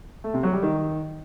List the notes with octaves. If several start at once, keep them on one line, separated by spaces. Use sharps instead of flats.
A3
C3
F#3
G3
D#3